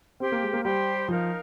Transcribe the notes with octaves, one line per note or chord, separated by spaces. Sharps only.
C4 G4 C5 G5 C6
A#3
G#3
A#3
G3 G4 C5 G5 C6
F3 D#4 A#4 F5